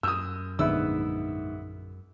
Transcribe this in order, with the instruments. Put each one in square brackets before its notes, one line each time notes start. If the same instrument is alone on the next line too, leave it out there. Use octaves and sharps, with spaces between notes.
[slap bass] F#2 [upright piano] D#6 E6
[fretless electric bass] A#1 D3 [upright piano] G#2 [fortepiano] B3 E4 E6